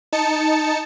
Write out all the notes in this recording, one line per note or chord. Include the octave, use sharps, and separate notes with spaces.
D#4 A5 C#7